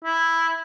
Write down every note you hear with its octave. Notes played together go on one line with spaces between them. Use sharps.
E4